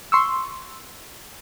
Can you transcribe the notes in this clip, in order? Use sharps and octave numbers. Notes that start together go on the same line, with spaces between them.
C6 C#6 E6